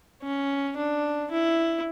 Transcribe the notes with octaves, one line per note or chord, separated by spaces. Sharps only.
C#4
D4
E4